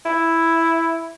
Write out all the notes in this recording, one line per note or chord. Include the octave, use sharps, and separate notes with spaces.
E4